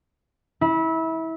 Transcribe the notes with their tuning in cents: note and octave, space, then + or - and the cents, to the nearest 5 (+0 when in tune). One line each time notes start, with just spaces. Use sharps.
E4 -25